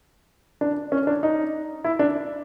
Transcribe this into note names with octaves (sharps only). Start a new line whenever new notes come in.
D4
C#4
D4
D#4
E4
D4